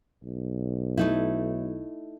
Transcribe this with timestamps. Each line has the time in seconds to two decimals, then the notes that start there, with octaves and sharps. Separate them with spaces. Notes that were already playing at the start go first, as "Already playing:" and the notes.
0.23 B1
0.97 A3 D#4 E4